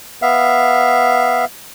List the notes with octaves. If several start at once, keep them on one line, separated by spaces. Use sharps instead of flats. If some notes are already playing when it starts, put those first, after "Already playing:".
B3 E5 F5